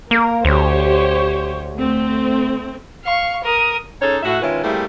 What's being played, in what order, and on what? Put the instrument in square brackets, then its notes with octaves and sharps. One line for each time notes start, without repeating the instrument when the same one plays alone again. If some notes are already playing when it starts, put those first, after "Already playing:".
[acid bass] A#3 [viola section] A#4
[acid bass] D2 [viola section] G4 C5 C#5
[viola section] A3 C4
[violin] F5 C#6
A#4 D#6
[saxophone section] C#4 D#4 G#4 A4 C#5
A2 F#4 E5
D#3 G#3 C#4 E4 F4 B4
G3 A3 A#3 C4 E4 G#4